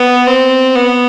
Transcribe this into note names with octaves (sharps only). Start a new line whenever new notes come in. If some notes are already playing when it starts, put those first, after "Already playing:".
Already playing: B3
C4
B3